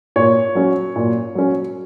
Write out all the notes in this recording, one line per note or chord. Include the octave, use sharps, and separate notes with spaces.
A#2 C#5
F#3 C#4
A#2
F#3 C#4